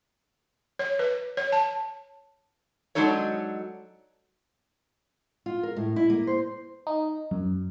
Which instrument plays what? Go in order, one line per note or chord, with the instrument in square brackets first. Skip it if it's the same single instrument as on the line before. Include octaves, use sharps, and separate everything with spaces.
[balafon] C#5
B4
C#5
A5
[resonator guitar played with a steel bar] F#3 G#3 D4 D#4 A4 C#5
[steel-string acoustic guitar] F4
A#4
A2
E4
A#3
C5
[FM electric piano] D#4
F#2